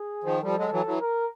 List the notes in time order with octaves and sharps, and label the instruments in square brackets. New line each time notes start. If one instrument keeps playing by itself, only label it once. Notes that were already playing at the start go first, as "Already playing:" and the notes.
Already playing: [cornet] G#4
[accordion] D#3 F3
[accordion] F3 G3 [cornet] A4
[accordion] F#3 G#3
E3 F#3
E3 F#3
[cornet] A#4